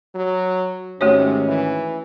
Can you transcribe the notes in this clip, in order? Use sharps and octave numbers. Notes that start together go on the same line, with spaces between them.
F#3
G#2 C3 D#3 A3 C#4 F#4 C#5
E3